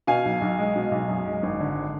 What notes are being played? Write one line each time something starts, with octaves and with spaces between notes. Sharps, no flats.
B2 F5 G#5
B1
B1
G#3
B2
B1
F#2
G#3
G#1
D3